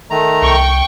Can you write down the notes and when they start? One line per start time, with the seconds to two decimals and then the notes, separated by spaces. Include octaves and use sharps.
0.11 D#3 A3 A#5
0.42 C2 G5 C#6